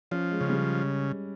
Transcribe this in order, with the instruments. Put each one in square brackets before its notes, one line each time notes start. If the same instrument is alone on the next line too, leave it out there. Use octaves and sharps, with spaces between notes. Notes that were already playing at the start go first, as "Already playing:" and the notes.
[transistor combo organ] F3 [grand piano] C#4
[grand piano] G#3
[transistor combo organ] C#3 [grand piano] G#3
[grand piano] G3